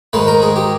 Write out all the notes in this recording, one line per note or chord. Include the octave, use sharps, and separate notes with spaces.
G#2 D#3 G#3 B4
A#4
G#4
G4